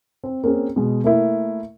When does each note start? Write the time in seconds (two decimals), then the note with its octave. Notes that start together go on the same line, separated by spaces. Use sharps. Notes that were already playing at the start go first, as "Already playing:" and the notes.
0.24 C4
0.44 A#3 C4 C#4 G#4
0.76 B2 G#3
1.04 A3 A#3 E4